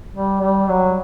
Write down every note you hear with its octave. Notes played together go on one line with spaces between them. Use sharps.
G3
G3
F#3